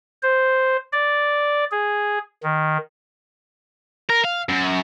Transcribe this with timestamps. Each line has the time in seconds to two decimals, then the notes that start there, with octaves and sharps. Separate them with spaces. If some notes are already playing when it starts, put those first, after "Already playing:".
0.23 C5
0.92 D5
1.71 G#4
2.43 D#3
4.09 A#4
4.24 F5
4.49 F#2